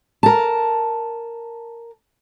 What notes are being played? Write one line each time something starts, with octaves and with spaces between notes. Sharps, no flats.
A#4 A5